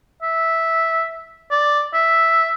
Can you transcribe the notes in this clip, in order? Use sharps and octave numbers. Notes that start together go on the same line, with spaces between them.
E5
D5
E5